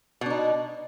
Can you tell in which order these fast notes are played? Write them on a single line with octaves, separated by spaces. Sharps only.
B2 D4 D#4